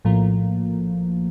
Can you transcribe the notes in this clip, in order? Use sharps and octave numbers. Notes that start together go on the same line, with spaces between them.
A#1 A2 F3 A#3